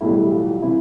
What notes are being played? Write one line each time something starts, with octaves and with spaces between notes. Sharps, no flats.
B1 A2 E3 G3 E4
G4
F4
C3 E3 E4